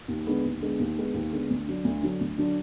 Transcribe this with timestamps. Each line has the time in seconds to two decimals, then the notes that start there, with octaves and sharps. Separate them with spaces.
0.08 D#2
0.27 D3 G#3 B3
0.44 D#2
0.61 D3 G#3 B3
0.79 D#2
0.97 D3 G#3 B3
1.14 D#2
1.33 D3 G#3 B3
1.50 D2
1.67 D3 F#3 D4
1.84 D2
2.03 D3 F#3 D4
2.21 D2
2.38 D3 F#3 D4